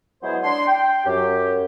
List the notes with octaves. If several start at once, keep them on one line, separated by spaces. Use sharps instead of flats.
F#3 G#3 B3 E4 G#4 C5
D4 C6
G5
F#2 G4